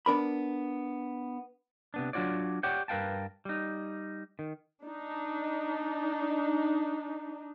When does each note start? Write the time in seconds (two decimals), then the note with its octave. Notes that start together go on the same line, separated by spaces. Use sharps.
0.06 B3 D4 A#4 B5
1.94 C3 B3 D4
2.13 F#3 D4 F4 F#4 C#5 D5
2.63 G4 C#5 D5 F#5 G5
2.88 G2 A#4 B4 F5 G5 A5
3.45 G3 D#4
4.39 D#3
4.84 D4 D#4